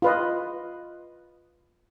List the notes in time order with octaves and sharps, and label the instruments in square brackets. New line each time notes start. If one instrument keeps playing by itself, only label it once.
[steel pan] F4 B4 D#5